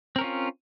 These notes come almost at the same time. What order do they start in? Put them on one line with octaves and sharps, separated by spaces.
C4 A#4 C#4 F4